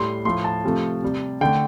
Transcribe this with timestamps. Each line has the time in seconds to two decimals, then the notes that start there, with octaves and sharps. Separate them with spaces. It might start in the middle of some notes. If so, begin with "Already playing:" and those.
Already playing: A2 G3 C6
0.25 A2 F3 A3 C6
0.44 A5
0.64 C3 F3 A3
1.02 C3 G3
1.41 D3 A3 G5